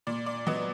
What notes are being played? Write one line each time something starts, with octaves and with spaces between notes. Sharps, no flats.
A#2 D5
D5
F#3 B3 D#5